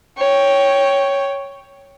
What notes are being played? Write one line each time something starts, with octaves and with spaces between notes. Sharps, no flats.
C#5 G5